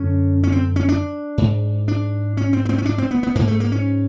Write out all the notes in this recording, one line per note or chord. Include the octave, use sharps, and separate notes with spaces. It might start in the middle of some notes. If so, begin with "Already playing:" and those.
Already playing: F#2 D3 C#4
C#4
C4
C#4
D4
G#2
D4
C#4
C4
B3
C4
C#4
D4
C4
B3
B3
G#2 A#3
A3
A#3
C#4